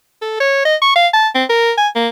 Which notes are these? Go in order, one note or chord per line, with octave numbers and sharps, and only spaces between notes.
A4
C#5
D#5
C#6
F5
A5
C4
A#4
G#5
A#3